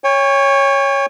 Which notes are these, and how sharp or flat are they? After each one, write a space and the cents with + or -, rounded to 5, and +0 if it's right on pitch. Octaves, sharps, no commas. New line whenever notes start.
C#5 +0 G5 +45